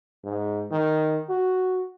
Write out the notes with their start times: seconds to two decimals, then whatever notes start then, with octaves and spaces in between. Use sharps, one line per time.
0.24 G#2
0.72 D#3
1.30 F#4